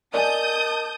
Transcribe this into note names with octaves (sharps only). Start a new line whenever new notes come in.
A#4 D5 D#5 G#5 A5 D#6 G6